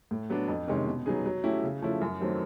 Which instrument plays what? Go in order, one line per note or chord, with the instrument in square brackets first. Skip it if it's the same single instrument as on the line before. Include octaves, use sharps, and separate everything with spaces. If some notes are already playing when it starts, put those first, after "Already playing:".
[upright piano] A2
F#3 B3 D4
F2
C3 D#3 G#3 C#4
B2
F#3 B3 D#4 G#4
F#3
A3 C#4 E4 G4
C#3
F3 A3 C#4 E4
F#2
D#3 F#3 A3 C4